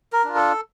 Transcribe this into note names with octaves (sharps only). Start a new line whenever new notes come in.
A#4
D4 F4
A4